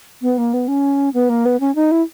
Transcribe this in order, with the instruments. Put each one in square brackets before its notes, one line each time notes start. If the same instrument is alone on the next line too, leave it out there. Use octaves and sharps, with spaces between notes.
[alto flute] B3
A#3
B3
C#4
B3
A#3
B3
C#4
D#4
E4